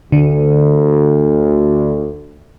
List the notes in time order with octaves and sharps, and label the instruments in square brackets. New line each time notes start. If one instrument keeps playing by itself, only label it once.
[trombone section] D2 [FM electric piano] D3